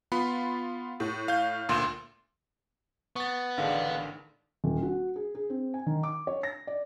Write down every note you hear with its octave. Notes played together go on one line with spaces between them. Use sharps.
B3 F4 B5
A2
F5 G6
D2 A#2 C6 E7
B3 C#6 A6
A1 D3 D#3 D4 G#4 F5
D#1
F#4
G#4
G#4
C4
G#5
D#3
D6
C#5
A#6
D5